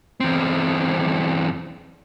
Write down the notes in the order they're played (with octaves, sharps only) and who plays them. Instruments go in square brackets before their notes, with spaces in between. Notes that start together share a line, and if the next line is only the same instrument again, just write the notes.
[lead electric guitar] E2 C4